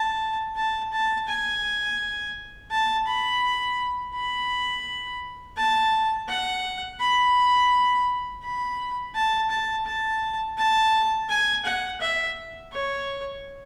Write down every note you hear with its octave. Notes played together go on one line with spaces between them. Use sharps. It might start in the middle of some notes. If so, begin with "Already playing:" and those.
Already playing: A5
A5
A5
G#5
A5
B5
B5
A5
F#5
B5
B5
A5
A5
A5
A5
G#5
F#5
E5
C#5